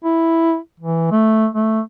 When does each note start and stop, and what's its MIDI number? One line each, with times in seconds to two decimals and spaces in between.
0.04 0.57 64
0.80 1.08 52
1.11 1.47 57
1.55 1.81 57